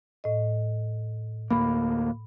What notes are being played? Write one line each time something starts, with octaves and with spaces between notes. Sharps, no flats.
A2 D#5
D2 A3 A#3 B5